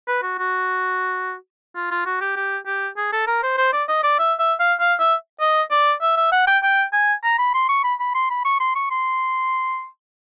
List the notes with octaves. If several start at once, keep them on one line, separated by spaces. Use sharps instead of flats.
B4
F#4
F#4
F4
F4
F#4
G4
G4
G4
G#4
A4
A#4
C5
C5
D5
D#5
D5
E5
E5
F5
F5
E5
D#5
D5
E5
E5
F#5
G5
G5
G#5
A#5
B5
C6
C#6
B5
B5
C6
B5
C#6
C6
C#6
C6